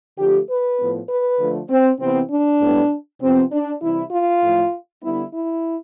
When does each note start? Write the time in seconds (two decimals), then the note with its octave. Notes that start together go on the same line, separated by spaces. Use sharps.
0.18 D3 F3 A3 G4
0.48 B4
0.79 A2 F3 B3
1.09 B4
1.39 D3 F3 A3
1.69 C4
1.99 C3 E3 B3 C4
2.30 D4
2.60 A2 G3 B3
3.21 C3 F3 B3 C4
3.51 D4
3.82 C3 E3 G3 E4
4.12 F4
4.42 A2 F3 A3
5.02 D3 G3 B3 E4
5.33 E4